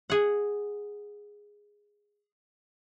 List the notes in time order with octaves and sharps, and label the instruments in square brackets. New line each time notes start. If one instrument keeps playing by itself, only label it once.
[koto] G#4 F#5